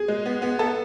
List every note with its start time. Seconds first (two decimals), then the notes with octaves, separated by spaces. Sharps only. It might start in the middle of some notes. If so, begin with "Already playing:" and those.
Already playing: G#4
0.08 G#3
0.26 B3
0.42 B3
0.59 B3 A4